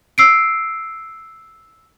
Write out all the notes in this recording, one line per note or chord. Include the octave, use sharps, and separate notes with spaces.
E6 C7 D7